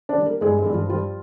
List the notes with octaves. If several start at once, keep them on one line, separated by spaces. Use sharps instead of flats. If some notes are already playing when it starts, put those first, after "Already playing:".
D4 D5
G3
A#3 A#4
G2 G#3 G#4
G#3 G#4
G2
F3 F4
F3 G3 F4